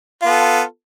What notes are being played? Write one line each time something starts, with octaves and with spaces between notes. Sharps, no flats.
B3 F4 A4